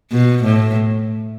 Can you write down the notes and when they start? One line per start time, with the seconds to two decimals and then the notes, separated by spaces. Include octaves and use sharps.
0.11 B2
0.44 A2